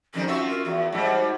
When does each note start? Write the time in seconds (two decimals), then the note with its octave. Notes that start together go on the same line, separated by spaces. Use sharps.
0.14 F2 D#3 G3 C#4
0.27 F4 F#4 E5
0.49 A#4
0.65 E2 F#4
0.92 G#2 G3